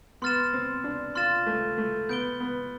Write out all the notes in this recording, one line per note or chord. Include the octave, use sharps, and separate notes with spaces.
B3 C6 F6 A6 E7
C4
D4
F4 C6 F6 A6 E7
A3
A3
B3 G6 D7 G7
B3